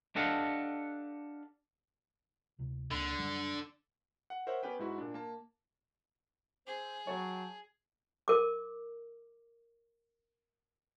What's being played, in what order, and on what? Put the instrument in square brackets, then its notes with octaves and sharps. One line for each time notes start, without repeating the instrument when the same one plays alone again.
[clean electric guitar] D4 G4 A4 D#5 F5 F#5
[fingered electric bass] D2 C3
[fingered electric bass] C#2 A#3 C4 [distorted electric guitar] D3
[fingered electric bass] F#2 G3
[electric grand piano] F#5
A#4 C5 C#5 E5 F#5
B3 C#4 G4 B4 G5
G#2 E4 F#4
A#2 D4
A#3 A5
[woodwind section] C4 C5 [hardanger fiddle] G#4
[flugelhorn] F#3 [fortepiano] C#5 [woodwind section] G5 A5
[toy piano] A#4 D6